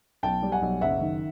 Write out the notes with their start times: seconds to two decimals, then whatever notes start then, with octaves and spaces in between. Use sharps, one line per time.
0.23 B1 G5 A5
0.43 G3
0.52 F#5 G#5
0.62 B1
0.81 F#1 E5 F#5
1.01 D#3